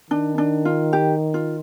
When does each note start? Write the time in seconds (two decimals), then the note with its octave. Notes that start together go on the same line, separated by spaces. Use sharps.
0.10 D#3 D4
0.38 D4
0.65 F4
0.93 G4
1.34 F4